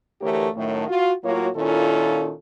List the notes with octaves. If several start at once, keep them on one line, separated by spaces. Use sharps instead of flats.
D2 E3 A3 G4 A#4 C#5
F#2 A2 D#3 A3
F4 F#4
A2 F#3 A#3 F4 F#4 C#5
A#2 D#3 C#4 E4 F4 A4